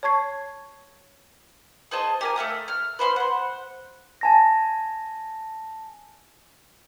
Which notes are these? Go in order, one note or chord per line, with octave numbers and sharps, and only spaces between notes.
C#5 A5 C#6 G#6 C7
G#4 C5 D#5 A5
G4 A#4 G#5
A3 E5 F5 D#6
F6
B4 C5 E5 C6
C5 F#5
G#5 A5 A#6